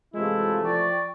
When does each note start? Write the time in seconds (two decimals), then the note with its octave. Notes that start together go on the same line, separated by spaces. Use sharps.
0.14 C3 E3 G#3 A3 E4 F4
0.63 F3 D5 G5 C#6